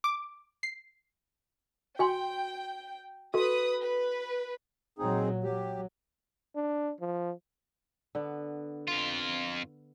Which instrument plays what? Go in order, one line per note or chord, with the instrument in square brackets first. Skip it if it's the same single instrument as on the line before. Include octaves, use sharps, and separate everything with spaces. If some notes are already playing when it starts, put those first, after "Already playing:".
[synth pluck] D6
C7
[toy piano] F#4 G#5 C6 [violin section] G5
[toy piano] F#4 A4 [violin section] B4 D#6
[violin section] B4
[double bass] A#2 F#3 [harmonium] C4 D#4 G#4
[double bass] F#3 [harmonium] G4
[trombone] D4
F3
[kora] D3 B3
[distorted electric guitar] F2 F4